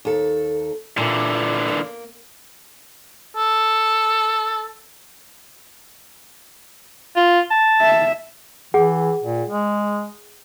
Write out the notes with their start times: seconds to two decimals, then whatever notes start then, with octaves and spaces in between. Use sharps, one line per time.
0.05 D#2 A4
0.97 A#2 D3 E3
1.68 A#3
3.36 A4
7.16 F4
7.51 A5
7.82 E5
8.74 E3 G#4 F#5
9.22 A#2
9.48 G#3